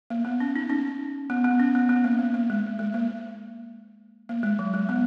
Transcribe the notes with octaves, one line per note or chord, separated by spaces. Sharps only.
A#3
B3
C#4
D#4
C#4
B3
B3
C#4
B3
B3
A#3
A#3
A#3
G#3
G#3
A#3
A#3
G#3
F#3
G#3
B3